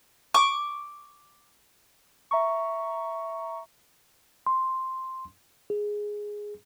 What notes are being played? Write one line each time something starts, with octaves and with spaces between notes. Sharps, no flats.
C#6 D6
E5 A#5 C#6
C6
G#4